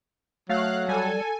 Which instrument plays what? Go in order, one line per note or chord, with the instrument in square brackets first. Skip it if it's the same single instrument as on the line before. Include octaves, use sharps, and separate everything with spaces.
[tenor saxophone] F#3 [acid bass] A3 [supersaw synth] F5 F#6
[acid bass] G3 [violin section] A4 [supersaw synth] G#5